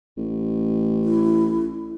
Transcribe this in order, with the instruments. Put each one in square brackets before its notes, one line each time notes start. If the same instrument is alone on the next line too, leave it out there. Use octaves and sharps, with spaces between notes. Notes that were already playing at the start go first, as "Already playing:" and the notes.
[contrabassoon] A1
[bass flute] E4